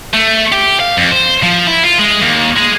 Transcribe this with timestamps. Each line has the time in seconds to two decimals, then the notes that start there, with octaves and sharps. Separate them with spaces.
0.14 A3
0.52 G4
0.80 F5
0.97 F2
1.11 C5
1.43 F3
1.67 E4
1.84 F4
1.99 G#3
2.22 D#2
2.57 G#3